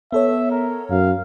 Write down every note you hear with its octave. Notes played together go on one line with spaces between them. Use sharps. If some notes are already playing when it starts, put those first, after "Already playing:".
B3 A4 C#5 E5
A#4
F#2 F5